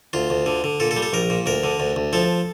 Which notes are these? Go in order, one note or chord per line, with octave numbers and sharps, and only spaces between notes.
D2 F4
D2
D3
D3
A#2 A4
A4
G3
A4
A#1 A#4
A#2
D2 A#4
D3
D2
D2
F3 A4